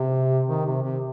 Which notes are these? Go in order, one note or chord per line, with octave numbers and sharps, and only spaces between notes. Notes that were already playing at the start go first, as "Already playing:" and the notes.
Already playing: C3
D#3
C3
C3